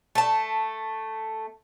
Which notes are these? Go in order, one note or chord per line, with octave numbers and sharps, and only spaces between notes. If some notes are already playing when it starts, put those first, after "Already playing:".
A3 A5